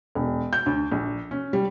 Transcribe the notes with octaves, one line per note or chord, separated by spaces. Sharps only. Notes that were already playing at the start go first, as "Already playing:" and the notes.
E1
G6
D2
A#1
C#4
G3